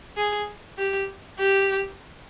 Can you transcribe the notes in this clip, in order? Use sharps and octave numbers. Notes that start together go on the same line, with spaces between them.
G#4
G4
G4